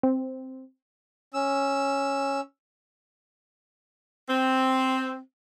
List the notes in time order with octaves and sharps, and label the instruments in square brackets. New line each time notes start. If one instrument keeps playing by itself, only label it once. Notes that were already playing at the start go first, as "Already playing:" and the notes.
[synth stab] C4
[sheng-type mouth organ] C#4 E6
[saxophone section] C4